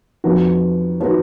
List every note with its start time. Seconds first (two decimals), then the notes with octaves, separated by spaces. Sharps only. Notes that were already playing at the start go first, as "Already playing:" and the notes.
0.24 F2 F3 B3 D#4 F#4
1.00 F3 B3 D#4 F#4